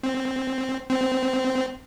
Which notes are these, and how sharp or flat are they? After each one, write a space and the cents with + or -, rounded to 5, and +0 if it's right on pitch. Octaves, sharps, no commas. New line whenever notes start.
C4 +0
C4 -15